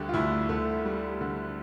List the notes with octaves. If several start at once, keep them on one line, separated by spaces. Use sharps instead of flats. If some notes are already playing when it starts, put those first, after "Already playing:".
Already playing: D2 D3 G3 G4
F4
D2 E4
D2 A3
G3
D3